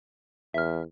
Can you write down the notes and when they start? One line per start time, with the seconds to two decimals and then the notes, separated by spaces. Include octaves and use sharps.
0.54 E2 E5 F6